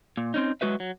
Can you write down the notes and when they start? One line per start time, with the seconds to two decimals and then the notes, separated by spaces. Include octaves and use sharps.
0.17 A#2
0.34 C4 C#4 D#4
0.61 F#3 G#3 F#4 B4 E5
0.80 F#3